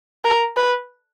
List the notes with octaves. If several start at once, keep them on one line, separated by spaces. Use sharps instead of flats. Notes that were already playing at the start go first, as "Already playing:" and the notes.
A#4
B4